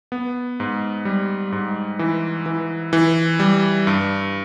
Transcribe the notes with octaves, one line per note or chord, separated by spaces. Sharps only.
B3
G#2
G3
G#2
E3
E3
E3
G3
G2